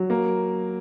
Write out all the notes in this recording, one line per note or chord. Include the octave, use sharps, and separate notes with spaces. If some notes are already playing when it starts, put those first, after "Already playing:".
Already playing: F#3
A#3